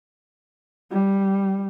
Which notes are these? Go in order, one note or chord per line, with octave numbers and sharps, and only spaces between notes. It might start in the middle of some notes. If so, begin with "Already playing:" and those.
G3